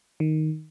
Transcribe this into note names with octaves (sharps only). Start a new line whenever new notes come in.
D#3